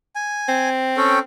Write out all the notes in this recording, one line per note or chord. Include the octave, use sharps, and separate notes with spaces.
G#5
C4
C#4 A4 G5